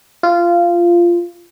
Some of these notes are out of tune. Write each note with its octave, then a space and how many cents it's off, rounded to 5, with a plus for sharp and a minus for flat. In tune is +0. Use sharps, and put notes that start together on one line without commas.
F4 -15